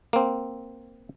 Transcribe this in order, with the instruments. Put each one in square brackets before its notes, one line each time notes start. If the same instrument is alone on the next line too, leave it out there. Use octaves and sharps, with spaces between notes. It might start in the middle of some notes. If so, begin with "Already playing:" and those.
[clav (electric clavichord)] A#3 C4